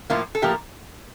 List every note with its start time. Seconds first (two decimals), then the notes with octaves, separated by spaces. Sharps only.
0.10 A2 F3 A#3 F4
0.35 A4
0.42 A2 F3 A#3 G4